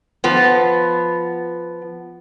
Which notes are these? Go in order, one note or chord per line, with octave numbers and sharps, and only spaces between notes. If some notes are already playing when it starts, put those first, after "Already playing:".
F3 B3